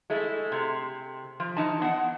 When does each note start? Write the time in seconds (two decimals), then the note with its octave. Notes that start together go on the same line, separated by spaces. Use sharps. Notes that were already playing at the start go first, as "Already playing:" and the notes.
0.10 G#3 A3 E4
0.52 C3
1.40 F3
1.57 E3 D#4 A5
1.82 B3 F#5